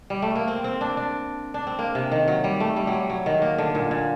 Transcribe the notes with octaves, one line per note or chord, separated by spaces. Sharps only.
G3
A3
A#3
C4
C4
D4
D4
D4
C4
A#3
C3
D#3
F#3
G3
A3
G3
F#3
G3
F#3
D#3
A#3
D3
A#2
A#2